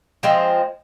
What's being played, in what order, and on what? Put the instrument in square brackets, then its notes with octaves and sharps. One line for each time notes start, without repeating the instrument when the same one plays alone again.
[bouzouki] F3 G#3 C4